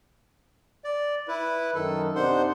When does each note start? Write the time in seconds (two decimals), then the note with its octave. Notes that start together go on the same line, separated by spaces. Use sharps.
0.84 D5
1.28 E4 B4
1.75 F#2 D#3 A4 A#4
2.15 C3 D4 D#4 C5 F#5 C6